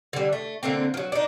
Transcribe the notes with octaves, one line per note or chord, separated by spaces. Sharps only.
D3 G3
A3
D3 A3 A#3 C4
F3 F#3
D4 D#4